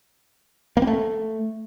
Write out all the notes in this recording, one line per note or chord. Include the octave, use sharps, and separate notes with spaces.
A#3
C4
A3